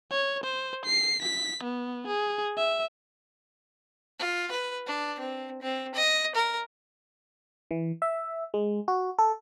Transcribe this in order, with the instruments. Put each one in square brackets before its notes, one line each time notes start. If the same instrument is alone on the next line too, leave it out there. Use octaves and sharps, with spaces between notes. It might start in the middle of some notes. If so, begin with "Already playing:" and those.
[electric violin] C#5
C5
C7
B6
B3
G#4
E5
[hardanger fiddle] F4
B4
D4
C4
C4
D#5
A#4
[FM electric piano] E3
E5
G#3
F#4
A4